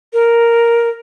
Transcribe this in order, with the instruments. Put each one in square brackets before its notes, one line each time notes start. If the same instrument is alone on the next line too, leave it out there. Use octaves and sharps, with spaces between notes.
[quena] A#4